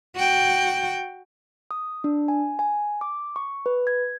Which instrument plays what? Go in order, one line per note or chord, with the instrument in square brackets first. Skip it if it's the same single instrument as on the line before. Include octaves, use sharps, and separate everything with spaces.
[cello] F#4 G5
[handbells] D#6
D4
G#5
G#5
D6
C#6
B4
G#6